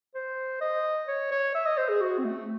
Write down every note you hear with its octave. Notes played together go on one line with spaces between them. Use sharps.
C5
D#5
C#5
C#5
E5
D#5
C5
G#4
F#4
C4
A3